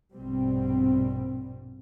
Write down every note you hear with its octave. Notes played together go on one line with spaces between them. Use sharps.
A#1 G2 B2 G3 C4